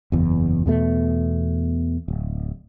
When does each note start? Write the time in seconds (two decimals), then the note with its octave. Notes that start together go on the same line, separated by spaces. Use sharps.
0.12 F#1 E2
0.66 E2 B2 A3
2.08 D1